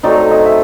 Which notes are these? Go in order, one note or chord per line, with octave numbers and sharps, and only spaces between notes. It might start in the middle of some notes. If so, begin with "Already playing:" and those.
F#3 A3 C4 D#4 D5
D#5
D#5
E5